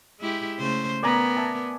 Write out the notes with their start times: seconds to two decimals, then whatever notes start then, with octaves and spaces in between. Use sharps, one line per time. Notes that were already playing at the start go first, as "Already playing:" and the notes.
0.20 G#3 E4 G4
0.59 C#3 A3 C5
1.03 B3 A#4 D5 G#5 A#5
1.36 E5 G#5 A5